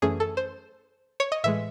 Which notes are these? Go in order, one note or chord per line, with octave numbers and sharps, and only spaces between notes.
F#2 E3 A3 C#4 G#4
A4
C5
C#5
D#5
A2 E3 G#3 E5